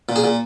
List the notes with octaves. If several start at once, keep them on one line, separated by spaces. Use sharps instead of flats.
A#2
G#4
A#2